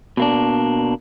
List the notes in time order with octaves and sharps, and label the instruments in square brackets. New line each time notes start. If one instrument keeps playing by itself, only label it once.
[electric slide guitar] B2 A#3 D4